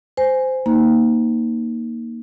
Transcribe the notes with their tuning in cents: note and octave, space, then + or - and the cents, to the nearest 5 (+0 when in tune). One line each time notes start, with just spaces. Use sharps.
C5 -15 G#5 -5
A#3 +0 D#4 +0